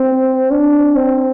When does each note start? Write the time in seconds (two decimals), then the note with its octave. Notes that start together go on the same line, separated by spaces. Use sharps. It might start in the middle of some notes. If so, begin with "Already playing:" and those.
Already playing: C4
0.51 D4
0.96 C4